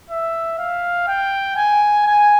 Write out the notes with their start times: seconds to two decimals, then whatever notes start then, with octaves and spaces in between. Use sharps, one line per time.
0.10 E5
0.59 F5
1.08 G5
1.57 G#5
2.06 G#5